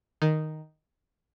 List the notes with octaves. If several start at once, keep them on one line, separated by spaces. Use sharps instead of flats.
D#3